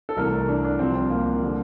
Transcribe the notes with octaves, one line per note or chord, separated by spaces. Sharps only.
A4
C2 C3 E3 A3 A#4
D4
D4
C2 C3 F3 C4
C4
A#3
D3 G3